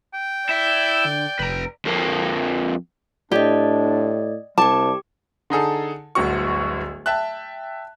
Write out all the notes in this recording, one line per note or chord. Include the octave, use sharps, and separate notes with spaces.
G5
E4 D5 E5 G6
D3
F1 B4 A#5
F2 A#3
A2 D4 G4 D5 D#5
C2 G3 G4 A5 D6
D3 D#4 G#4 A4
D1 G1 D2 F#4 C#6
E5 G5 A5 F#6